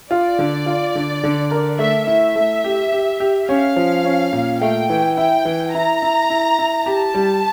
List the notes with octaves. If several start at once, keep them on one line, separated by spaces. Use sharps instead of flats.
F4 D5
D3
F4
D3
D3
A#4
A3 E5
E4 E5
A3
G4
G4
G4
C#4 F5
F3
C#4
A#2
A3 G5
E3
E4 G5
E3
E4 A#5
E4
E4
E4
G4 A5
G3